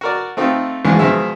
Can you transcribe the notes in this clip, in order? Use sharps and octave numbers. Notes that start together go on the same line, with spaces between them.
F#4 A#4 D5
A3 C4 D#4 F4 A4
A#1 E2 G#2 G#3
B2 D#3 F3 G#3 E5